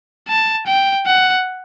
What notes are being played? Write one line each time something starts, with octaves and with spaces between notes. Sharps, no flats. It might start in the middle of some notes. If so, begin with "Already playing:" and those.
A5
G5
F#5